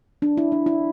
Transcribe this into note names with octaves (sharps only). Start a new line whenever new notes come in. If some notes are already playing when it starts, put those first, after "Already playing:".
D4
E4
D4
E4